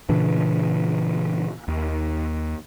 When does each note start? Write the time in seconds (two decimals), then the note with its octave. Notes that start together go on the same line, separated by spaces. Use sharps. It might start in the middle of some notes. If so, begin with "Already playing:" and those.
0.09 A#2 C#3 E3 D4
1.68 D#2